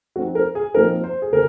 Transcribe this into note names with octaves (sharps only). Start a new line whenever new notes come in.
F3 C4 D#4 F#4
A#4
G#4
A#2 F3 C4 D#4 A#4
C5
G#4
C#3 A#4